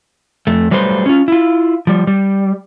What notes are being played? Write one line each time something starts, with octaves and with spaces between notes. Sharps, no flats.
F2 A3
F#3 G3 A3 B4 C5
C#4 F4
E4 F4
F3 G3
G3